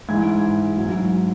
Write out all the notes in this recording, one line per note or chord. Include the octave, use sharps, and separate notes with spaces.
G#2 E3 G#6
G#2 F#3